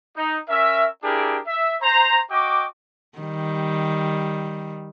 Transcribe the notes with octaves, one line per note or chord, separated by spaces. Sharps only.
D#4
C#4 A#4 E5
D4 E4 G4 G#4 A#4
E5
C5 A#5
F#4 D#5 G5 D6
D#3 G3